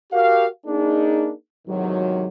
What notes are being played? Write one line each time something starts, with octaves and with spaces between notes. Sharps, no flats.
F#4 G4 A#4 F5
A#3 D4 D#4 G#4
E2 G#2 C3 D#3 F#3